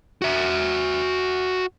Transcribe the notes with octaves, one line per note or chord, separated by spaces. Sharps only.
F#4 E5